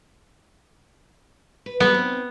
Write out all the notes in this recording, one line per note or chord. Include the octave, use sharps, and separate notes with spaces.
B4
F#3 G3 B3
C4 D#4